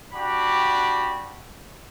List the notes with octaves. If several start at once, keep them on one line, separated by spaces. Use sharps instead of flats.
D4 F#4 G4 B5 D6